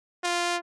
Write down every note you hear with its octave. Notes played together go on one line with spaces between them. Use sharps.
F4